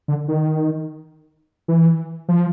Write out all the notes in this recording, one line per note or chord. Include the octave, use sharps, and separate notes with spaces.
D3
D#3
E3
F3